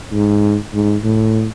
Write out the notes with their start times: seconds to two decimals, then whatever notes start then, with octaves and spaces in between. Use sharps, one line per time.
0.13 G#2
0.74 G#2
1.04 A2